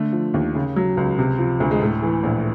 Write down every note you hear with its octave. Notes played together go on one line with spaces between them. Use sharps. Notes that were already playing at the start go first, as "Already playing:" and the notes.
Already playing: D3 A3
F3
D#2
C#3
F#3
C#2
C3
F3
D2
G#3
A2 A3
E3
A#1